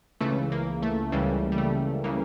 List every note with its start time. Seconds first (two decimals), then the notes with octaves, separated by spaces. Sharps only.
0.21 C#2 C#3 E3 A3
0.52 A#3
0.82 A3
1.12 C#2 C#3 E3 G3
1.52 G3
1.58 A3
2.04 C#3 E3 A#3